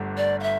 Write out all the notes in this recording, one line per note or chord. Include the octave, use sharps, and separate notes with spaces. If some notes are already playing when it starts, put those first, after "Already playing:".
Already playing: G1 G2 D3 A3
D5
F5
E5